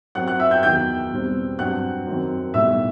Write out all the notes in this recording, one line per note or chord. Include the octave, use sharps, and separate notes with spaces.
F#2 F#3 C4 F#5 F#6
F#5 F#6
E5 E6
G5 G6
E2 D#3 F#3 G5 G6
E2 B2 G3 C4
G2 F#3 C4 F#5 F#6
F#2 D#3 F#3 C4
B1 A2 G3 E5 E6